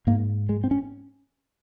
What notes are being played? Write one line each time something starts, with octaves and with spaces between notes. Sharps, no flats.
G#2 A#3
G#3
C4
C#4